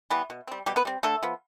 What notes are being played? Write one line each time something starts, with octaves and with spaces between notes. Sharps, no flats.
E3 G3 B3
B2
G3 C4
B2 G3 G4
B3 B4
G3 C4
D3 A3 A4
F3 B3